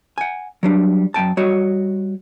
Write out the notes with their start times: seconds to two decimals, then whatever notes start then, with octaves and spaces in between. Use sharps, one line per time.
0.18 F#5 G#5
0.63 F#3 G3 D4
1.14 F#2 A#3 G5 A5
1.37 G3 F#4 C#5 D#5